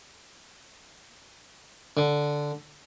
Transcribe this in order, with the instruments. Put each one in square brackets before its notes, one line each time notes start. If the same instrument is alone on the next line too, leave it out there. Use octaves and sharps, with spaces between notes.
[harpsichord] D3